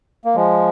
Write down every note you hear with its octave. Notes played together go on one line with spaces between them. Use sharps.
A#3
F3 G#3